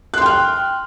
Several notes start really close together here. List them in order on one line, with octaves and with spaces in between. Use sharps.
F#6 C6 G5 F6